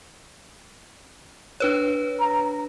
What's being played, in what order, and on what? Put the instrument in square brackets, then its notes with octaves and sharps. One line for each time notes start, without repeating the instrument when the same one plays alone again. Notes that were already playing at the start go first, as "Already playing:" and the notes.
[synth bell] D4 B4 C#5
[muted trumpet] A#5